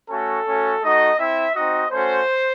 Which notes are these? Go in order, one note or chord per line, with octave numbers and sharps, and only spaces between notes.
A3 C#4 F#4 A4
A3 C#4 F#4
A3 D#4 F#4 D#5
C4 E4 E5
C4 D#4 F#4 D#5
A3 C#4 F#4 C5